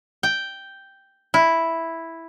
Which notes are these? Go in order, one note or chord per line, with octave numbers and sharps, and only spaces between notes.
G5
E4